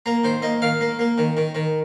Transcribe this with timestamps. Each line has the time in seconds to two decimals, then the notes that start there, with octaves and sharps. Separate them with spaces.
0.06 A#3 A#5
0.24 D#3 C5
0.42 A#3 D#5
0.62 D#3 F5
0.81 A#3
0.99 A#3
1.18 D#3
1.37 D#3
1.55 D#3